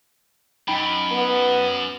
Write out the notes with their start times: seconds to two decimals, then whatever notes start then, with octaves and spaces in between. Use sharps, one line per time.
0.68 F#2 D#4 G5 B5
1.12 B3